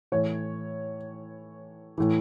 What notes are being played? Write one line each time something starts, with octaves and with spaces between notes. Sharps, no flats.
A2 E3 C#5
A2 E3